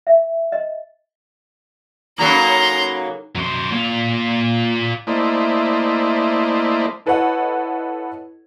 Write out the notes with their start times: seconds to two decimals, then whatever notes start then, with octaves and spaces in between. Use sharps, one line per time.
0.07 E5
0.52 D#5
2.18 C#3 F#3 A#3 D#4 A4 A#4 A#5 C6
3.35 F#2 C5
3.72 A#2 F4
5.07 A3 A#3 E4 C5 D5 D#5
7.06 E4 A4 B4 C#5 D#5 F#5